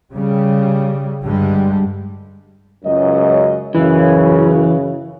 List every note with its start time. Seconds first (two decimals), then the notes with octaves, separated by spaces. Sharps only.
0.14 C#3 G3
1.23 G2 D3 G3 G#3
2.85 C#2 F#2 D#5
3.75 F#2 C#3 E3